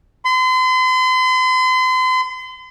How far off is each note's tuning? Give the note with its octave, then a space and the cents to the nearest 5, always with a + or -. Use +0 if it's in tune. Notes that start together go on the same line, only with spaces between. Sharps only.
C6 -40